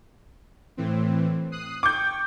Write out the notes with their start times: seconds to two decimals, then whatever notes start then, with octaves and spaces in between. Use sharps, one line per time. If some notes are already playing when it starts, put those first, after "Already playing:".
0.77 A2 E3 C4
1.52 D#6 F#6 C7
1.83 G5 C#6 D6 G6